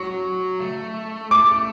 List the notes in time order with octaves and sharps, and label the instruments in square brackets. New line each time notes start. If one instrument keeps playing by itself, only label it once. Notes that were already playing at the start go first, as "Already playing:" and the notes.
Already playing: [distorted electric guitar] F#3 [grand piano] C#6
[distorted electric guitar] A3
[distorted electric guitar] A3 [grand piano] D6